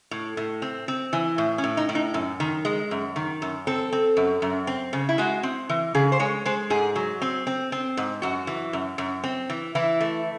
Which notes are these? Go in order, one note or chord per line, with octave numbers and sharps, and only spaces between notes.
A2
A2
C4
C4
E3
A2
C#4
A2
D#4
A2
D#4
F#2
D#3
G#3
F#2
D#3
F#2
C4 A4
C4
F#2
F#2
C4
C#3
E4
G#3 F#4
C4
E3
C#3 G#4
C5
G#3 C#5
G#3 C5
G#2 G#4
F#3
C4
C4
C4
G#2
F#2 F#4
E3
F#2
F#2
C4
E3
E3 E4
A3